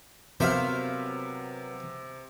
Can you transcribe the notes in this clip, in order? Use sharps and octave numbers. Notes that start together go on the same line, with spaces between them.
C3 F#3 B3 A#4 C5 E5 F5